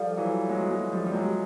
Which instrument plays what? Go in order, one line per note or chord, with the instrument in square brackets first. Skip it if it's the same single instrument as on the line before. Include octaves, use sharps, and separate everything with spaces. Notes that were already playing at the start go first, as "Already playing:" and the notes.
Already playing: [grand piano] F3 G3 [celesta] A4 D5 F5
[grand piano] E3 F#3
F#3 G#3
F#3 G#3
F3 G3
G3
F#3 G#3